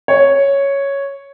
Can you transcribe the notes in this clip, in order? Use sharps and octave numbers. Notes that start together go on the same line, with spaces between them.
C#5